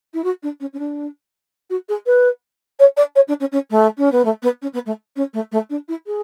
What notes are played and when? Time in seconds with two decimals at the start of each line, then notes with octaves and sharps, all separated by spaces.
0.14 E4
0.24 F#4
0.43 D4
0.60 C#4
0.73 C#4
0.79 D4
1.70 F#4
1.89 G#4
2.06 B4
2.79 C#5
2.97 D5
3.15 C#5
3.28 D4
3.40 C#4
3.52 C#4
3.70 A3
3.97 C#4
4.12 B3
4.25 A3
4.42 B3
4.62 C#4
4.73 B3
4.86 A3
5.16 C#4
5.33 A3
5.52 A3
5.70 D4
5.88 E4
6.06 G#4